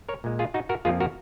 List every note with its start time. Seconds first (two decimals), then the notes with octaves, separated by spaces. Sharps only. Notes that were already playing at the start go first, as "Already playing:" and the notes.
0.09 A#4 C#5
0.24 A#2 G#3
0.39 F4 G#4
0.54 D#4 F#4
0.69 F#4 A#4
0.85 F2 F3 A#3 F4 G#4
1.00 F#4 A#4